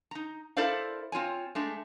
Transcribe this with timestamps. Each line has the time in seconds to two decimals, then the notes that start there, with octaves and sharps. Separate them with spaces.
0.11 D#4 A#5
0.57 E4 A4 A#4 C5 D5 F5
1.12 C4 F4 C#5 G#5
1.55 G#3 A3 D4